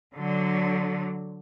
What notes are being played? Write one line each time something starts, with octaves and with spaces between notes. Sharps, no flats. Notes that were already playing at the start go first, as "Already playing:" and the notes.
D3 F#3